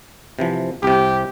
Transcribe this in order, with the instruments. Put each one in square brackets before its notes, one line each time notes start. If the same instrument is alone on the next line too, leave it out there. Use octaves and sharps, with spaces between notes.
[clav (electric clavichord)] C3 E3 F3
[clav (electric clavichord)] C2 C3 [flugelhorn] G4